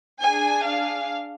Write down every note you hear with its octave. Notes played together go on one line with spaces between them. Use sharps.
D4 G#4 G#5
F5